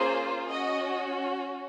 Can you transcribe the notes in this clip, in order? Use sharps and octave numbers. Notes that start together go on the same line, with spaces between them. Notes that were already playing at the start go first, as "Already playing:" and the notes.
Already playing: A#3 C#4 F4 G#4 C5
C#4 F#4 D#5